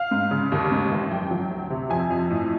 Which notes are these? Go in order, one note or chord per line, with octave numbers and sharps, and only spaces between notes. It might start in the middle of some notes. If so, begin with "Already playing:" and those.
Already playing: F5
G#2
C#3
D#2
G#2
A1
F#2 G5
F#3
D2
C3
F2 G#5
F2
A2